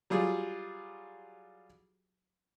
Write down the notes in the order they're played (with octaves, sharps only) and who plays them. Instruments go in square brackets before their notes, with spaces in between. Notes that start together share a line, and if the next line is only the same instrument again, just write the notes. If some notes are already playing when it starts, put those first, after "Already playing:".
[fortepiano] F#3 G3 F4 G#4